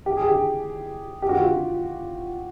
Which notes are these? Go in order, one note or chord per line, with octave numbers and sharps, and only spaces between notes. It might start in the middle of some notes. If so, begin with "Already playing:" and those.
G4
G#4
G4
G4
F#4
F4
F#4